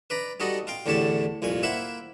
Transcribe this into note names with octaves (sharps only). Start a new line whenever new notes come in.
B4 D5 A#5
G3 D#4 F#4 A4 D#5
F4 F5 G5
E2 A2 D3 G4 C#5 A5
C2 F2 A#2 G#5
A#3 E4 C5 E5 F#5